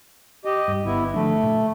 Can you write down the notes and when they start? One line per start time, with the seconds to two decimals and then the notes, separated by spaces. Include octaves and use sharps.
0.45 G4 D#5
0.68 G2
0.85 G1 B3 E4
1.14 D3 F3 A3 D4
1.43 A#2